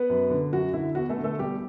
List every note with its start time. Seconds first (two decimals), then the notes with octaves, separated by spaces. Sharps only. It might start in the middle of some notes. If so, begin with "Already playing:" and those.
Already playing: B3 B4
0.10 F#2
0.30 D3
0.52 F#2 F#4
0.73 D3 E4
0.95 E2 F#4
1.09 A3 A4
1.17 D3
1.24 A3 A4
1.38 E2 G3 G4